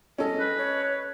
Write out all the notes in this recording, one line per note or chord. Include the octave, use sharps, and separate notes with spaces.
C#4 A4 D#5
B4
C#5
B4